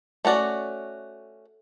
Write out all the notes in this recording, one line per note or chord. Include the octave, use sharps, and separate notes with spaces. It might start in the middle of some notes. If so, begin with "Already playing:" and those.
A3 C#4 F#4 D5